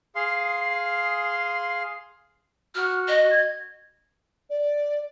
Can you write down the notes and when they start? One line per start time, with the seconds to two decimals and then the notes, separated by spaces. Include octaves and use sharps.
0.15 G#4 F5 C6
2.75 F#4 F6
3.08 D#5
3.30 G#6
4.50 D5